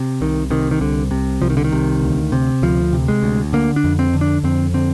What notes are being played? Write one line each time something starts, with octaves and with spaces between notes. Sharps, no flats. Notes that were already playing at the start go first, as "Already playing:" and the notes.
Already playing: C3
C2 D#3
C3 D#3
D#3
C2 D3
C3
C2 F3
D#3
D3
D#3
C3
D2
C3
D2 F3
C3
G#3
D2
D3 A#3
D4
F2
C4
D3
D4
F2 C4
D3 C4